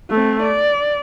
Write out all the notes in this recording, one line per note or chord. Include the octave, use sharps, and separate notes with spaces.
A3 C4
D5